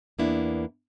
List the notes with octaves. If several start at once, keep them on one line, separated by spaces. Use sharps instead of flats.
E2 A#3 B3 D4 E4